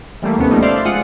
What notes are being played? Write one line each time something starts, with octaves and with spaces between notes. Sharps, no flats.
E3 G3 A3 A#3
D#2 C3 A3 B3 C#4
F3 G3 A3 A#3 D#4
C5 D5 E5 F5 C6
G#3 F4 F#5 D#6 C#7